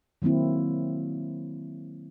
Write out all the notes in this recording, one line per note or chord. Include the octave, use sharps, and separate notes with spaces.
D#3 F#3 A#3 C4 E4